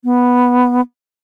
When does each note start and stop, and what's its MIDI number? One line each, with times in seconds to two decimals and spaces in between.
0.04 0.81 59